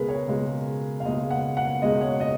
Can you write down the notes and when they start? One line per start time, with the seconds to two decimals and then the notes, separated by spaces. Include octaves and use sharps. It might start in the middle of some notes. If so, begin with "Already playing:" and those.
Already playing: C#2 B2 G#3 G#4 A#4 B4
0.09 C#5
0.28 C#2 B2 G#3
1.00 F5
1.05 C#2 B2 G#3 D#5
1.30 F#5
1.57 F#5
1.82 C#2 B2 G#3 D#5
2.01 C#5
2.20 D#5